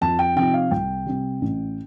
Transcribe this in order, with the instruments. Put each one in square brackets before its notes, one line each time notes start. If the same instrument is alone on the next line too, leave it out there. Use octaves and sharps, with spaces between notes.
[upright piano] F2 [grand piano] A5
[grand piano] G5
[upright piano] C3 F3 C4 D#4 [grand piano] G5
[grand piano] F5
[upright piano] C2 [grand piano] G5
[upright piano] C3 G3
A1